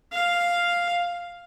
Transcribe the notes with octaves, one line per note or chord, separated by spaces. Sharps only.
F5